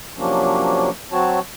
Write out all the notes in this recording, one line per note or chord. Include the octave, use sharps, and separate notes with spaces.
C3 F3 F#3 A#3 C#4 D4
F#3 C4 F#4 C#5 A5